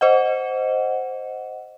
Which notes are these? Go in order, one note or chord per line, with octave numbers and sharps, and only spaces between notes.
C5 D#5 F#5